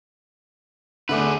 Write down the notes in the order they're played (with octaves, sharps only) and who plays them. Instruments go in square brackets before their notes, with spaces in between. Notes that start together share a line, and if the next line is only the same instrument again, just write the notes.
[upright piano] D3 A3 D6 [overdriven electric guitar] G#4 B4